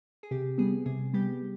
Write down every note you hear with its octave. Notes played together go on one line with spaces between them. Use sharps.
G#4
C3 G4
G3 B3 G#4
C3 G#4
G3 B3 G4